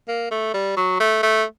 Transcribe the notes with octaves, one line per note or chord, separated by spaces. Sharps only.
A#3
A3
G3
F#3
A3
A3